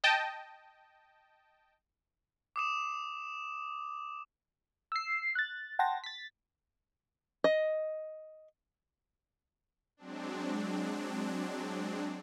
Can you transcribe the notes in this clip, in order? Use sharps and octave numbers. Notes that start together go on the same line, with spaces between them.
D#5 G5 A5
D6 D#6 E7
E6 C7
F#6 A6
F#5 G5 A5 C6 A6 A#6
A6 B6
D#5
F#3 G#3 C4 D4